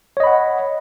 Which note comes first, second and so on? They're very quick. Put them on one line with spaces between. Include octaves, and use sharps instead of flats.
C#5 D#5 B5 F#5